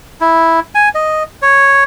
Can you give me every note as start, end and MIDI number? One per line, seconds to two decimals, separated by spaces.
0.21 0.60 64
0.75 0.89 80
0.95 1.23 75
1.42 1.84 73